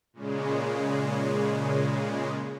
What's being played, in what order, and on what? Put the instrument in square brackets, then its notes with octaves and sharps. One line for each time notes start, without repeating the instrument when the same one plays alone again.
[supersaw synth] A#2 C#3 G#3